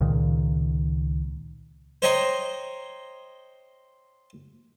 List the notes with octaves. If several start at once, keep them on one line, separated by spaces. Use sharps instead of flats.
C#2 A#2 D#3
C5 C#5 D#5 G5 A#5 C6